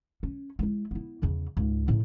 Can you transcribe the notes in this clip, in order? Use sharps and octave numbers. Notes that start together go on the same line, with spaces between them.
C#4
G#3 E4
B3 E4
E2 C#3
C#2 G#2
A2 C#3